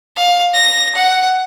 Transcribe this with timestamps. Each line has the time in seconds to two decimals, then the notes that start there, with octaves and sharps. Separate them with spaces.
0.17 F5
0.54 A#6
0.96 F#5